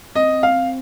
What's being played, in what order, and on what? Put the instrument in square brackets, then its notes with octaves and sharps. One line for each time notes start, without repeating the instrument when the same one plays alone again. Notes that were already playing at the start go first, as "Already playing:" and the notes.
[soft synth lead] C4 [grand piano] D#5
[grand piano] F5